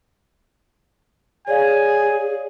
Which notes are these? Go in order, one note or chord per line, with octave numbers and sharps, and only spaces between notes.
G#4 C#5 D5 F5 G#5